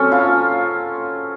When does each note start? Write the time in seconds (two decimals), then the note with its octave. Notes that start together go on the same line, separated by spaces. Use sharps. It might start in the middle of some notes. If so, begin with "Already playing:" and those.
Already playing: F#3 C4 C#4 A4
0.12 F4